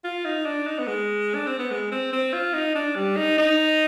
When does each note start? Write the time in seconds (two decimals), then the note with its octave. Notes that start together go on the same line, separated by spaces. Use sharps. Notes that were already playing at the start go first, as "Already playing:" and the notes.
0.04 F4
0.25 D#4
0.46 D4
0.67 D#4
0.79 B3
0.87 G#3
1.35 D4
1.47 C4
1.59 B3
1.71 G#3
1.92 C4
2.13 C4
2.33 F4
2.54 D#4
2.75 D4
2.95 G3
3.17 D#4
3.38 D#4